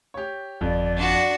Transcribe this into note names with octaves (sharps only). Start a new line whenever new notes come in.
G4 C#5
G1 F2 F3 D5
D4 F#4